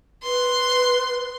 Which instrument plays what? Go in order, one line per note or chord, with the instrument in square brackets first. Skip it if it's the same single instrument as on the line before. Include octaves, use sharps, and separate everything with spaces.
[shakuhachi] B4 [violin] C6